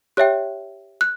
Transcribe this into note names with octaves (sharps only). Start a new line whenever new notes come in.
G4 C#5 E5 G5 F#6
F#6